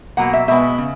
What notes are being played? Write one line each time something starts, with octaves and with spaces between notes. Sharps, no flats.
B2 F#3 A#3 F#5
E5
B2 G#3 B3 E5
C#3